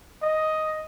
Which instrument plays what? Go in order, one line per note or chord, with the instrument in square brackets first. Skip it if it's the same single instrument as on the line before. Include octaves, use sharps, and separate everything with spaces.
[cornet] D#5